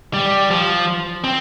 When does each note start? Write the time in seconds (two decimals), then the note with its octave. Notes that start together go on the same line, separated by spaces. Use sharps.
0.14 G3
0.51 F3
1.24 C4